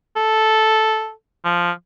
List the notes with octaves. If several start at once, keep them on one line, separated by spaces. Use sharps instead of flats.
A4
F3